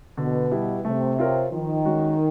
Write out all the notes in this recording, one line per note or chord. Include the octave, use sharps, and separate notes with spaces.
B2 D3
G3 B3 E4
C3 A3
C4 F4 A#4 C#5
D#3 F3
G#3 C#4 F#4